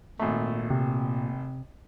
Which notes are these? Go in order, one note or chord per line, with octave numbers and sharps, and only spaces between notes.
G#1 A#2 A3
C3